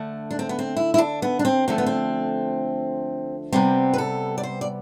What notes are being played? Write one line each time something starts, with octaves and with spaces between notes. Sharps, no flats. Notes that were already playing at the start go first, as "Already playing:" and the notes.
Already playing: D3 A3
D4
C4
B3
C4
E4
E4
D4
B3
D4
C4
D3 F3 A3 C4
B3
C4
C3 G3 B3 C4
B4
A4
D5
C5
D5